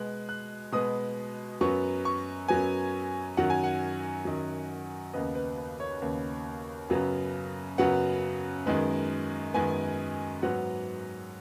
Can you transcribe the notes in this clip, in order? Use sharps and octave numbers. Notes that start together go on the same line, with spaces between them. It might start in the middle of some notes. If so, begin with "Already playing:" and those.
Already playing: B2 G#3 B3 F#6
F#6
B2 G#3 B3 D#6
F#2 F#3 B3 C#6
C#6
F#2 F#3 B3 G#5
F#2 D#3 F#3 F#5
G#5
F#5
F#2 D#3 F#3
D#2 C#3 B3 D#5
B4
B4
C#5
D#2 C#3 B3
F#2 C#3 F#3 B3
F#2 C#3 F#3 B3 F#5
F#2 D#3 G#3 B3
F#2 D#3 G#3 B3 G#5
G#2 F#3 B3 F#5